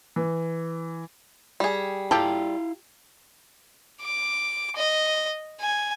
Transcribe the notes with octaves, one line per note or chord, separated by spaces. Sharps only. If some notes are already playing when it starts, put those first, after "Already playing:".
E3
G3 G#4
E4 F4 G4 A4 F5 A#5
D6
D#5
G#5